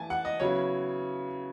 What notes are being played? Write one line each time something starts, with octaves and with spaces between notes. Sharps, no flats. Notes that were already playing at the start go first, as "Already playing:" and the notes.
Already playing: E3 A3 E4 G#5 A5
F#5
D#5
C#3 F#3 B3 E4 C#5